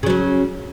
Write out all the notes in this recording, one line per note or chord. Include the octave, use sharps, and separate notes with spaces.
C#3 F#3 C#4